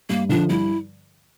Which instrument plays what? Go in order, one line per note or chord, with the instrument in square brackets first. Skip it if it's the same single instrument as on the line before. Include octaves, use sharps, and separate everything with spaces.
[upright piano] G2 [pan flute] A#3
[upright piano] D3 F3 [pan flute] D4
[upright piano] G2 [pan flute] E4